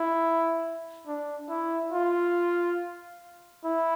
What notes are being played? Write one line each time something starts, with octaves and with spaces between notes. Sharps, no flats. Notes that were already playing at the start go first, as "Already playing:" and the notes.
Already playing: E4
D4
E4
F4
E4